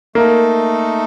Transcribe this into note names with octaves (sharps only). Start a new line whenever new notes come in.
A3 A#3 D#4 A4